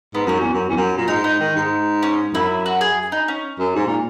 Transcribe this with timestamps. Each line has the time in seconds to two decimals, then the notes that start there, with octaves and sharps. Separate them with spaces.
0.14 G#2 B3
0.27 F#2 C#4
0.40 E2
0.53 F#2
0.69 E2
0.77 F#2
0.97 A#2
1.08 G#2 D#4
1.24 D#4
1.40 D#3
1.56 G#2
2.03 C#4
2.34 F#2 E4
2.66 F#4
2.81 G#4
3.12 D#4
3.28 C#4
3.59 F#2
3.75 G#2
3.87 A#2